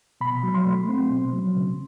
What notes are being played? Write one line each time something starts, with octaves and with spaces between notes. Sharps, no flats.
B2 B5
F#3
C6
A3
C4
B2
F#3
C#3